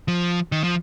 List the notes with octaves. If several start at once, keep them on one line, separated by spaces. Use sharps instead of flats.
F3
D#3
F3